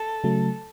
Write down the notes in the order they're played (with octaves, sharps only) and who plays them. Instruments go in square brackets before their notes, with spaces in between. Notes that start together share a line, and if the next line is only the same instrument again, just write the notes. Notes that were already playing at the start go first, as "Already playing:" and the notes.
Already playing: [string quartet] A4
[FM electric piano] C#3 F#3 A3